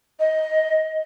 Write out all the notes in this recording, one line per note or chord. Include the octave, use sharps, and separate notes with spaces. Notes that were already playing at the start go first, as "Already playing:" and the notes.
D#5